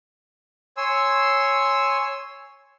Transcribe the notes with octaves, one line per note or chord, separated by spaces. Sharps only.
C#5 G#5 C6 E6